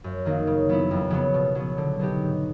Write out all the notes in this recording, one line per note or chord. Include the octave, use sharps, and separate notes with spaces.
F#2
D#3 F#3 A#3 D#4
C#3
F#3 B3 E4
F2
C#3 F#3 B3
B2
F#3 B3
D3
F#3 B3 D#4 G4
G#2